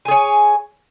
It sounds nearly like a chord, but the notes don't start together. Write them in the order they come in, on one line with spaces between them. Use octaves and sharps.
G#5 G#4 C#5